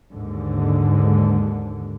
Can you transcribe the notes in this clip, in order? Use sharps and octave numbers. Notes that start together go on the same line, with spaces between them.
D#2 G#2 D3